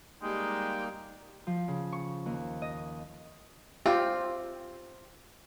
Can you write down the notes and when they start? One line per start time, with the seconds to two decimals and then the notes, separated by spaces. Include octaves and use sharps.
0.22 G3 G#3 A#3 D#4 G4 G5
1.47 F3
1.68 C#3
1.93 C#6
2.26 D#2
2.62 D#5
3.86 C4 F4 G4